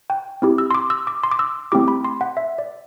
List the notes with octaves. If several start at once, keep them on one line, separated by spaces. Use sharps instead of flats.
G5
C4 E4 G4
E6
C6
D6
E6
D6
C6
D6
E6
A3 C4 E4 G4 D6
B5
C6
F#5
E5
D5